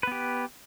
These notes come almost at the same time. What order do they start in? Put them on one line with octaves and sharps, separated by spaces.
B4 B3 G4